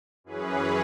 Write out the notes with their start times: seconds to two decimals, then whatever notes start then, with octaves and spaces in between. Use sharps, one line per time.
0.24 F#2 E3 C#4 G#4 B4